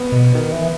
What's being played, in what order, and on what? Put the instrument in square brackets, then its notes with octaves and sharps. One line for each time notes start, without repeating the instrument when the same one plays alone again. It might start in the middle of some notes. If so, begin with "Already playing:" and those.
Already playing: [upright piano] B3
[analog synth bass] B2
D#3
E3